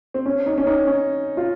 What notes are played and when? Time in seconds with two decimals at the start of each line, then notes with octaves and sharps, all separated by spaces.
0.14 C4
0.26 C#4
0.46 D#4
0.58 C#4
0.67 D#4
0.87 C#4
1.37 F4